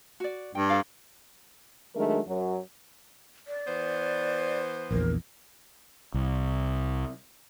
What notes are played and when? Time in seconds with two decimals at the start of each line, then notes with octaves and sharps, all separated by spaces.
0.20 F#4 D5
0.55 G2 G5
0.69 A4 D5 F5
1.95 D#3 F#3 G#3 A3 D4 A#4
2.28 F#2 F#3
3.48 D5
3.67 E3 B3 C5
4.91 A#1 E2 A#4
6.14 C2